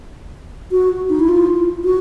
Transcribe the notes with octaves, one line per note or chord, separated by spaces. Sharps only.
F#4
D#4
E4
F4
F#4